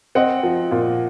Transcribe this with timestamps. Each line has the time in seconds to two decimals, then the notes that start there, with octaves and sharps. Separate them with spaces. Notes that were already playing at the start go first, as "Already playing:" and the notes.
0.15 C4 D#5 F#5
0.43 F3
0.71 A#2